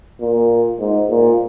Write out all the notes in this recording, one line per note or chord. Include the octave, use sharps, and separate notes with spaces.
A#2
G#2
A#2